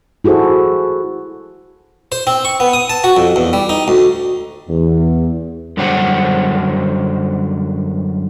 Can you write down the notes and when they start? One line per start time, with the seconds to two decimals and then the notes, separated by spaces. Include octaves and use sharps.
0.24 E4 F#4 G#4 A4 C5
2.12 C5
2.27 C4
2.45 C#6
2.60 B3
2.73 D#6
2.90 A5
3.04 F#4
3.17 F2
3.36 E2
3.53 G3
3.69 D#4
3.88 D2
4.68 E2
5.77 F#2 D3 F#3 G3 C5 F#5